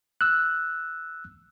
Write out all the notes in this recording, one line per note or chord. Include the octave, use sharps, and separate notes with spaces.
E6 F#6